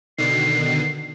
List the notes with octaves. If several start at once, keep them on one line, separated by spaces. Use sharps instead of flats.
B2 D3 D#3 C7